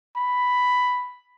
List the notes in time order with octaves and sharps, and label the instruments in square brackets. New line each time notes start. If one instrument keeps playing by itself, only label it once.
[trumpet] B5